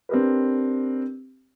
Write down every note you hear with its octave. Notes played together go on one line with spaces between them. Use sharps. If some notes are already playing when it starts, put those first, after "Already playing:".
C4 D4 G4 A#4 B4